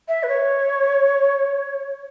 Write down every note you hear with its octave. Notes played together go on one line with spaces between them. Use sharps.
E5
B4
C#5